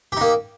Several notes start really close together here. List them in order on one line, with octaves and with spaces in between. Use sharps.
G4 D#4 A#3